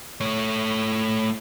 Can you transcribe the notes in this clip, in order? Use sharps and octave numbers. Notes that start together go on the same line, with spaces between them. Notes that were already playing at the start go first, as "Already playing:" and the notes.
A3 C#5